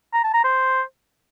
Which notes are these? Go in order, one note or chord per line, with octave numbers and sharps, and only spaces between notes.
A#5
A5
A#5
C5